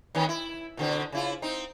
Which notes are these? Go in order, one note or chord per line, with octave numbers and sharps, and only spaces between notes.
D#3 B3 C#4
E4
B2 D3 C4
C#3 E4 F4
C4 D#4